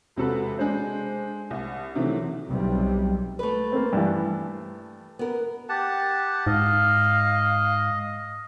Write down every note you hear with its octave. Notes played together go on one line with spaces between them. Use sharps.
E1 C3 F#4 A4 B4
G#3 D4 C5
C2
C3 D#3 E3 F#3 A3
B1 C3 G3
A3 B4
A#3 C4
G2 E3
B3 A#4
G4 F#5 A5
G#2 D#5 F5